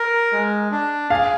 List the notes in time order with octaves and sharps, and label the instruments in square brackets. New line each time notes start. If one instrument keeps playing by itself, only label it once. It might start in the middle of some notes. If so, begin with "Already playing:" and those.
Already playing: [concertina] A#4
G#3
D4
[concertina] G#4 [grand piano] F5